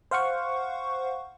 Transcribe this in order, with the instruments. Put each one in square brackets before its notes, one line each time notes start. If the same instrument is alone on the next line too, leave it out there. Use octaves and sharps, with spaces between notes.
[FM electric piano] C5 F5 F#5 C#6